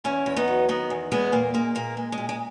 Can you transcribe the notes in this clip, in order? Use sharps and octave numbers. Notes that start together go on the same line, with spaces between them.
E2 C#4 E4
E2
B3 D#4
F#3
D#3 B3 D#4
E2
E2 G#3 B3
A#2 A#3
G#3 A#3
A#2 A#3
G#3
G#3
A#2
G#3